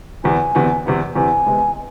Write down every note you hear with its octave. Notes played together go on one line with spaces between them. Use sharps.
E2 C3 E3 B3 G#5
E2 C3 E3 B3
E2 C3 E3 B3
E2 C3 E3 B3 G#5
C3 G#3 B3